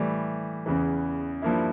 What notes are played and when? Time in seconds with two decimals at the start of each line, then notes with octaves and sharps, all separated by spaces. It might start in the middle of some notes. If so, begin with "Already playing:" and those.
Already playing: A2 E3 G3
0.66 E2 C#3 E3
1.42 G2 F3 A#3 E4